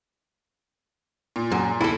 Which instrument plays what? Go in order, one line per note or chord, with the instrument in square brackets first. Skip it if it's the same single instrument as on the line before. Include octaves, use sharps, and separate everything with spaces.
[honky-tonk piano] A#2
[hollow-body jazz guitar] F#2
[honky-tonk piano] D#2 [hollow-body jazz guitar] E4 A4